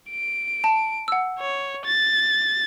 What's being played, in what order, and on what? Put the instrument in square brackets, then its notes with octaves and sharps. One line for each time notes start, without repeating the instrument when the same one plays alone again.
[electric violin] D7
[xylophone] A5
F#5 E6
[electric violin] C#5
A6